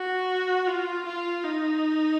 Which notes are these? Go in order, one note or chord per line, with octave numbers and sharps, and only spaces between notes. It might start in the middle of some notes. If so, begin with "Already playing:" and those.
Already playing: F#4
F4
F4
D#4